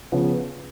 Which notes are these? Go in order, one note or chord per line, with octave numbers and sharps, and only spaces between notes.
C#3 F3 B3